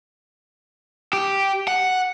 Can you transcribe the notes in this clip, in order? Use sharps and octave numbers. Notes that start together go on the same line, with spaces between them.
G4
F#5